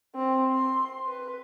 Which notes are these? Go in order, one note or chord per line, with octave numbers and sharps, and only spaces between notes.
C4
C6
B4